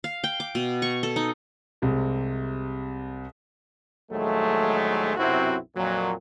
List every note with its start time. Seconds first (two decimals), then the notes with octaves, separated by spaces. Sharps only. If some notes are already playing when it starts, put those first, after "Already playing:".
0.04 F5
0.24 G5
0.40 D6
0.55 B2
0.82 C#6
1.03 A4
1.16 D#4
1.82 C2 C3 G#3
4.11 A#1 D#2 F#3 G#3 A3
5.17 B1 F#2 C3 C4 E4 F#4
5.77 F2 A#2 F#3